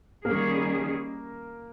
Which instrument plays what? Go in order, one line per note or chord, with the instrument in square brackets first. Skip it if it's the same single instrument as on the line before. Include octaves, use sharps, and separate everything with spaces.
[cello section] D#3 G3 C#4 G#4 [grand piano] A#3 A#4